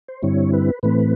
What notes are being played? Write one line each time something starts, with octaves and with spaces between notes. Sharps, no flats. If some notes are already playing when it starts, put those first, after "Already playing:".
C5
G2 D3 G3 C4 E4 C#5
B4
A2 E3 A3 C4 B4